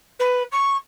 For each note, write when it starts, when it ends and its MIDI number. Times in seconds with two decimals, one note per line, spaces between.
0.19 0.43 71
0.52 0.76 85